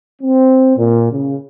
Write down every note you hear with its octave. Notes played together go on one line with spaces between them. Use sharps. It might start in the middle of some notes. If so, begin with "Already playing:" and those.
C4
A#2
C#3